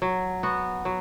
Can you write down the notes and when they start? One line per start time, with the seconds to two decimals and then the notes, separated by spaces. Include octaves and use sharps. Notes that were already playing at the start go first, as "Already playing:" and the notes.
0.02 F#3
0.43 B3 F#4
0.85 F#3